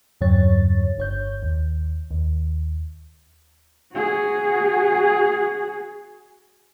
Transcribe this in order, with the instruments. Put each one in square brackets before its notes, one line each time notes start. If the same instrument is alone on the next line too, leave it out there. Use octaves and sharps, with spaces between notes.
[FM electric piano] E2 G2 C#3 F#3 C#5 A6
G1 C#5 G6
D#2
D#2
[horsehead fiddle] F#4 G#4